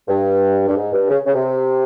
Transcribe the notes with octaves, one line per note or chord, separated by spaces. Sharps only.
G2
G2
G#2
G2
C#3
C#3
C3